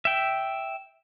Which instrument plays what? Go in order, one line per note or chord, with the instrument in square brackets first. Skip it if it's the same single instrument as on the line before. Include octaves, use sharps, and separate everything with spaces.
[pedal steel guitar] E5 G5